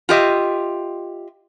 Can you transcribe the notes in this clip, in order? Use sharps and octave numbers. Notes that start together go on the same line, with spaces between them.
F4 G4 D#5 E5